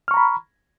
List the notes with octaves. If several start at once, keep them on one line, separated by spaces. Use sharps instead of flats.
A#5 B5 C#6 F6